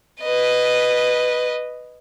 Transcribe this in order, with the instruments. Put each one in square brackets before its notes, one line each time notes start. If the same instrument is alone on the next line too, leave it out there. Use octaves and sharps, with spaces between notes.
[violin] B4 D#5